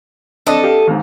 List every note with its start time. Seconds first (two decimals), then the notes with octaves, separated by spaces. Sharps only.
0.47 C4 D4 A4 D#5 A5
0.64 G4 F5
0.87 D#2 G#2